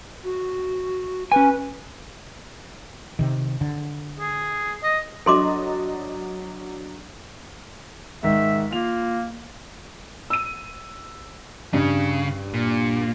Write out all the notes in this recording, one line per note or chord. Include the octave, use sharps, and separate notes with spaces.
F#4
C#4 B4 G#5
C3 D#3
D3
G#4
D#5
F#3 D4 A4 D#5 C6 D6
G#2 D#3 E5
A#3 F4 F7
E6 D#7
G2 C#3
A#2